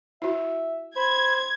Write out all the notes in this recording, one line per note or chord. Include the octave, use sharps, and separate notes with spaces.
E4 F#4 E5
C5 B5 G#6